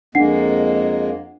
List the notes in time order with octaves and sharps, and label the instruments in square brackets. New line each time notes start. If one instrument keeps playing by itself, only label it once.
[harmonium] F2 G#3 A#3 [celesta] D4 F#5 C7